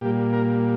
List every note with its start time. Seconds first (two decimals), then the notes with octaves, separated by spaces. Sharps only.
0.01 A#2 G3 A#3 G4
0.33 A#4